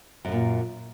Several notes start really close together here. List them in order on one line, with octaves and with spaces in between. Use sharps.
F#2 C#3 A#2